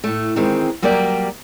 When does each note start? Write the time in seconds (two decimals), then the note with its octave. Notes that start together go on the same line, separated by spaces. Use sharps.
0.04 A2 A3
0.36 D#3 E3 G#3 C4
0.82 F#3 G3 A#3 G4 D5